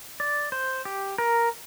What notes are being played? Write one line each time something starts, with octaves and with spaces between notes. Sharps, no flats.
D5
C5
G4
A#4